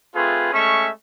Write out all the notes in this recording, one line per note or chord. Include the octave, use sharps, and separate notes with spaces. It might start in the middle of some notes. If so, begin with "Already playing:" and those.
A3 C4 F4 G#4 B4
G#3 A3 C#4 E5 C#6